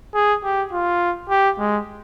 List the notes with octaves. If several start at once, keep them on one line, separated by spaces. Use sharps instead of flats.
G#4
G4
F4
G4
G#3